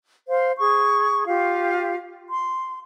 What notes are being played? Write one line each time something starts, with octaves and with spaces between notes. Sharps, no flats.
C5 F5
G#4 C#6
F4 G4 F5
C6